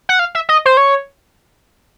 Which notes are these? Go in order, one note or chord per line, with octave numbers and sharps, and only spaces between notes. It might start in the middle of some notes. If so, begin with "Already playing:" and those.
F#5
F5
E5
D#5
C5
C#5